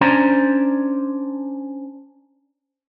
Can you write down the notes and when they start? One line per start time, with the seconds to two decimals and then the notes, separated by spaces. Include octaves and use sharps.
0.01 C#4 D4 C5 D5 A#5